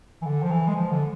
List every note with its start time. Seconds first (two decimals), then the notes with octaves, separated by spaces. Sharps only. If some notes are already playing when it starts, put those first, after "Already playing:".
0.22 E3
0.26 D3
0.43 F3
0.51 E3
0.68 G#3
0.76 F3
0.92 D3